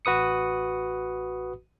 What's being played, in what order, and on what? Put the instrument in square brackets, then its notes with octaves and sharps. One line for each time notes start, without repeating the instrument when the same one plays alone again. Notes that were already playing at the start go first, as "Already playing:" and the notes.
[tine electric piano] A1 F#4 B4 D#6 C#7